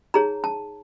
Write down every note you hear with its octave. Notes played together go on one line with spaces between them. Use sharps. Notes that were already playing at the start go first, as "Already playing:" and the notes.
D#4 G#4 C#5 A#5
A5